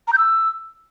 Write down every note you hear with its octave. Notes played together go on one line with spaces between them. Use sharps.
A#5
G6
E6